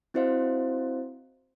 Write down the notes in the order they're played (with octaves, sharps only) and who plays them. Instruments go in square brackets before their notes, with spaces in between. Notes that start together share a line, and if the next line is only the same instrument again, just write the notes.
[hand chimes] C4 E4 F#4 C5 D#5 F5